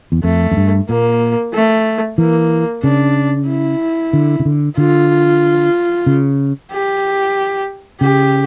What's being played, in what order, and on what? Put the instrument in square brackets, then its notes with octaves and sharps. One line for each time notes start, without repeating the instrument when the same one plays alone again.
[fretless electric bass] E2
[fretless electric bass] F2 [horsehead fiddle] A3
[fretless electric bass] F2
G2
[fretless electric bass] A#2 [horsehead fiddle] A#3
[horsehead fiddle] A3
[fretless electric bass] E3 [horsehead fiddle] A#3
[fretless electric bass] C#3 [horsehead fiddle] D4
[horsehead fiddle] E4
[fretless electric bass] D3
C#3
D3
[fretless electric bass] D3 [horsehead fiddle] F4
[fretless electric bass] C#3
[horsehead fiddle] G4
[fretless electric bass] C#3 [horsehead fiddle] G4